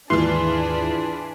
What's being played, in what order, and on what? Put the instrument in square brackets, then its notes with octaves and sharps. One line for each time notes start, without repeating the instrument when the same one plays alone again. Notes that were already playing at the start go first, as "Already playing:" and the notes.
[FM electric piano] D#2 G#2 C6 [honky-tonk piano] E3 F4 [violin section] D4 G#4 B4